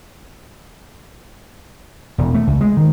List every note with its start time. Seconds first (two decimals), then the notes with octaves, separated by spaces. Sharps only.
2.18 E1
2.34 A3
2.47 C#2
2.61 G#3
2.77 D#3